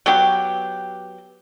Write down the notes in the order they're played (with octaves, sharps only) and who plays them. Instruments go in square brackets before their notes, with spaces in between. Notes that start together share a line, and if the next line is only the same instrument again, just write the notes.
[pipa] F#3 B3 G4